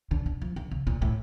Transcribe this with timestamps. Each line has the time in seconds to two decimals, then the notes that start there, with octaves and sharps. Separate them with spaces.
0.11 D3
0.26 D3
0.42 F3
0.56 D3
0.71 C#3
0.87 A#2
1.02 A2